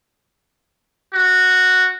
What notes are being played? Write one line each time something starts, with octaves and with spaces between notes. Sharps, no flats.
F#4